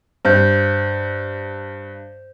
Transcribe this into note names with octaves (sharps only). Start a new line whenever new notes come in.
G2 C5 G6